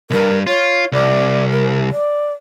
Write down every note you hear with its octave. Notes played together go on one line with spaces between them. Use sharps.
B1 G2 A#4
F4 C#5
C2 D5
A#4
D5